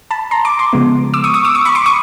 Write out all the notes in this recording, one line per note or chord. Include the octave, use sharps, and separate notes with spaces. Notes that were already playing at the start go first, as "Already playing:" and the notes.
A5 B5
A#5 C6
C6 D6
C6 D6
C#3 F3 G#3 B3
D6 E6
C#6 D#6
C#6 D#6
D6 E6
C#6 D#6
B5 C#6
C6 D6
C#6 D#6